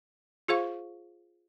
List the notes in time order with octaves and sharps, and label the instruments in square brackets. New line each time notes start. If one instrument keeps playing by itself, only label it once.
[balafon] F4 G#4 C5 F5 C#6